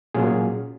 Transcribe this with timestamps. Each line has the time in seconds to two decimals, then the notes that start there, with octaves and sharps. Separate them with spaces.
0.14 A#2 F#3 C#4 F4 G#4